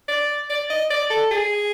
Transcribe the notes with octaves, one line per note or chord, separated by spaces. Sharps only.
D5
D5
D#5
D5
A4
G#4